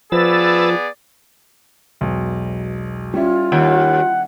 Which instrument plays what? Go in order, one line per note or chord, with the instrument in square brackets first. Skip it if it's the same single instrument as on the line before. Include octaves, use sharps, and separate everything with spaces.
[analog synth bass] F3 [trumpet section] B3 G#4 D5 [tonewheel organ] B4 E6 A6
[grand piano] E1 B1
[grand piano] G3 C#4 E4 [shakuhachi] F4
[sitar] D#2 [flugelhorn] F#5